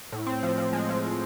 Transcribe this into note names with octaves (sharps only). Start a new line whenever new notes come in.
A2
C4
F3
F3
G#3
F3